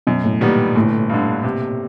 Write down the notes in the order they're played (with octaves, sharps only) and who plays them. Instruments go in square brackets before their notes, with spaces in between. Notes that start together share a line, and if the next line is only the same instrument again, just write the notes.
[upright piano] F#2 [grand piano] B2
[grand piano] A2
[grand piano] A#2 [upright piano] D#3 G3 B3
[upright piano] G1 [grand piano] A2
[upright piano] G2 D3
C3